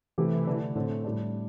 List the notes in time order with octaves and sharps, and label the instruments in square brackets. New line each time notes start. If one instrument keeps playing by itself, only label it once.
[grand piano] C3 A3 E4 G4 [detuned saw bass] E3
[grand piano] D3 A3 D4
[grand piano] A2 A3 C4 [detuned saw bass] D3
[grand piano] A2 G3 D4